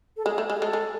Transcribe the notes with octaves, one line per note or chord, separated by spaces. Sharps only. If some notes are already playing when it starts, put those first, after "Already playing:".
A4
G#3 G#4
A3
G#3
G#4
G#3 A4
G#3